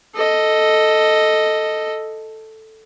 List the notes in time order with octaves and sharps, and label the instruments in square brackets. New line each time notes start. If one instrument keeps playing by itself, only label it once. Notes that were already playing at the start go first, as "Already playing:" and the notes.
[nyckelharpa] A4 D#5